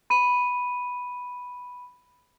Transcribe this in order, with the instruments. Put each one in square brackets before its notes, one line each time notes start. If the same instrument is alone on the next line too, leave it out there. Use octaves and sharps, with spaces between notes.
[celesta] B5 D#7